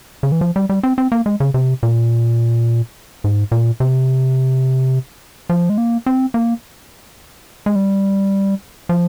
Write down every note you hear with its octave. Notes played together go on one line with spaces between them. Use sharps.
C#3
E3
F3
G3
G3
C4
C4
A#3
G#3
C#3
C3
A#2
G#2
A#2
C3
F3
G#3
A#3
C4
A#3
G#3
G3
F3